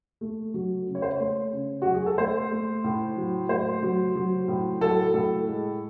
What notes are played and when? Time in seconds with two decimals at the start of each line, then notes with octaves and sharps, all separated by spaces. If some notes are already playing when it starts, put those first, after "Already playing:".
0.21 A3
0.54 F#3
0.87 C#3
0.95 C#5
1.02 C5
1.11 C#5
1.20 A3
1.53 C#3
1.82 F#3 F#4
1.94 G#4
2.06 A4
2.18 A3 C5
2.51 A3
2.84 A2
3.17 F#3
3.49 A3 C5
3.83 F#3
4.15 F#3
4.48 A2
4.81 F#3 A4
5.13 A2 A4
5.46 G#3